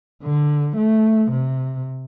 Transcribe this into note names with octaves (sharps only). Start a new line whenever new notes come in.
D3
A3
C3